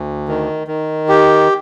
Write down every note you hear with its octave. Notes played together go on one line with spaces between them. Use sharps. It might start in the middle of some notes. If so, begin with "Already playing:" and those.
Already playing: D2
D#3
D#3
G4